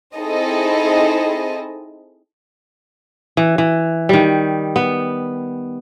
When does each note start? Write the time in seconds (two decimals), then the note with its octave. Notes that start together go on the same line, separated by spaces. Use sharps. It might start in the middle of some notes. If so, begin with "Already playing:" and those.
0.16 C4 D#4 E4 G#4 A4 D#5
3.37 E3
3.58 E3
4.09 D#3 G3
4.76 B3